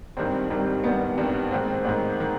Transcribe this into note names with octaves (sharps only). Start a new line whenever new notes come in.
G#1 G2 D#3 G3 C4
G#1 G2 D#3 G3
G#1 G2 D#3 G3 B3
G#1 G2 D#3 G3
A1 G#2 D#3 C4
C4
A1 G#2 D#3
D#3